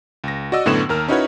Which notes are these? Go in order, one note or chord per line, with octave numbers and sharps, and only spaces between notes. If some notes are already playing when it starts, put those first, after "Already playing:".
C#2 A#6
F#4 D5 D#5 E6
F#2 A2 D3 B3 C#6 E7
D#2 A#4 F6
C#4 D#4 E4 F#4 B4 C#5